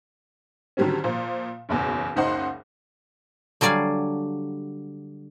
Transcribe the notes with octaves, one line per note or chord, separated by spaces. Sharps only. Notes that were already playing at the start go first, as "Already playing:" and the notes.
D3 D#3 F#3 G3 C4 C#4
A#2 F3
F#1 B1 E2
F#1 C#2 D#4 C5 F#5 C6
D3 F#3 G3 D5 F5 G#5